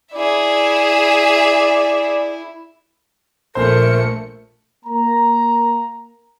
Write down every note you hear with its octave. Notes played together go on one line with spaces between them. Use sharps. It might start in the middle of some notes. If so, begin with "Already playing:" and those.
E4 G#4 D5 E5
A#1 A#2 A3 A#4 C5 C#7
A#3 A#5